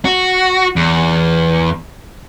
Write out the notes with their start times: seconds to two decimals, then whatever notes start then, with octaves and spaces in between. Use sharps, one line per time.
0.05 F#4
0.76 E2